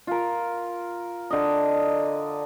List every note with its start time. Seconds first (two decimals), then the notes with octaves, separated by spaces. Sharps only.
0.07 F4 A#4
1.31 D3 D#5